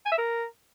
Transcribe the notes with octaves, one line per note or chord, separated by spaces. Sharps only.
G#5
E5
A#4